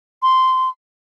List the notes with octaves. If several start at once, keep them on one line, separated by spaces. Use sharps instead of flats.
C6